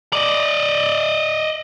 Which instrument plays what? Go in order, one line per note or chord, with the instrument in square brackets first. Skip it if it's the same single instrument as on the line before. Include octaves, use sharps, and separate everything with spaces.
[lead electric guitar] D5 D#5